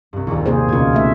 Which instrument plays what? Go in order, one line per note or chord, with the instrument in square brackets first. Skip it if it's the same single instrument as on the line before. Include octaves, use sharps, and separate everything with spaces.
[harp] C2 G2
A#1 D#2
[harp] C3 [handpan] A#3 G#4 C5
[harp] C#2 G#6 [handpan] B2 F4
[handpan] D#3 A3 E5